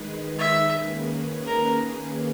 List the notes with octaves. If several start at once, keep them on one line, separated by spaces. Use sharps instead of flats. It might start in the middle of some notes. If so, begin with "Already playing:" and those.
Already playing: D#3 G#3 D#4 G#4 B4
E5
D#3 A#3 C#4 G#4 B4
A#4